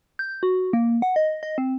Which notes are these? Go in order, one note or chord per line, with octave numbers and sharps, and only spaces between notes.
G6
F#4
A#3
F#5
D#5
D#5
C4